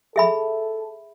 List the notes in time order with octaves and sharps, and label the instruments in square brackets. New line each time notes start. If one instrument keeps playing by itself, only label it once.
[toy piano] G#4 E5 B5 [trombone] A4